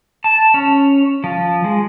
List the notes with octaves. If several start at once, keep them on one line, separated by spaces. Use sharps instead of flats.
A5
C#4
F3
G#3